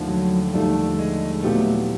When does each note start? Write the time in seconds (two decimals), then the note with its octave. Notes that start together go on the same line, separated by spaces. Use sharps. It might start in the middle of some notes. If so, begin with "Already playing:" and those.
Already playing: D#2 D3 F3 A3
0.09 F#3
0.53 D#2 D3 F3 G3 A3
0.99 G#3
1.43 A#2 F#3 A3 B3 E4 G4